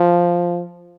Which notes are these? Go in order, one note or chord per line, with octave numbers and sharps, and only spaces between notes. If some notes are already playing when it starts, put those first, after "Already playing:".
Already playing: F3